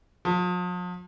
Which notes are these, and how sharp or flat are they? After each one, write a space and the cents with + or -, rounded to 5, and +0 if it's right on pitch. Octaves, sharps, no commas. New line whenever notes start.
F3 +45